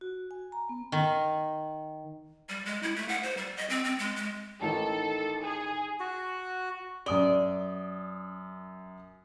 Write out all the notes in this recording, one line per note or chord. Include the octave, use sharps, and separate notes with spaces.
F#4
G#5
A#5
B3
D#3
G3
G#3
E4
A3
F#5
C5
G3
D#5
C4
C4
G#3
G#3
A1 D#3 A4
G#4
F#4
F#2 D5 D#6 G7